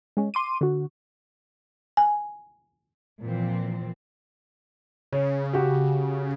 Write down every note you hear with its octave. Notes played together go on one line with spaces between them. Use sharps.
G#3 C#4
C6 D6 D#7
D3 F#4
G#5
A#2 E3 F3 C4
C#3 C#5
F#4 G4